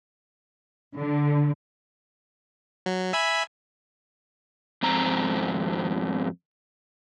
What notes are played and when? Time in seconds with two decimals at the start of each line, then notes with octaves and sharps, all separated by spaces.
0.97 D3
2.86 F#3
3.13 E5 G#5 B5
4.82 F2 G#2 C4 A#5